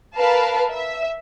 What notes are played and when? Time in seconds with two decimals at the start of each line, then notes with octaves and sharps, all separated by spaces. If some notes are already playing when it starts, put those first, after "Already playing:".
0.15 A#4 B4 F5 A5
0.71 E5